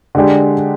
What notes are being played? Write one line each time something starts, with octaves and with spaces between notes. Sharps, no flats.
D3 G#3 D4 G4